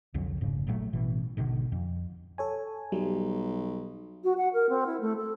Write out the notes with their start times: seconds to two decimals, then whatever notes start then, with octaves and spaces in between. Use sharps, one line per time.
0.14 C2 F2 D3 F#3
0.41 F1 G#2 C#3
0.67 A#1 A#2 F#3 A3
0.93 A1 B2 E3
1.37 G#1 B2 D3 D#3
1.72 F2
2.38 A4 C#5 G#5
2.92 B1 F#3 G3
4.23 F#4
4.37 F#5
4.53 A#4
4.69 C4
4.86 E4
5.01 A3
5.16 A4